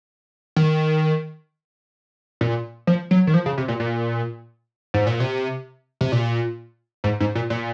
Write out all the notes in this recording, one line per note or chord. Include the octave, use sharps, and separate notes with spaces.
D#3
A#2
F3
F#3
D#3
F3
C#3
C3
A#2
A#2
G#2
A#2
C3
C3
A#2
G#2
G#2
A#2
A#2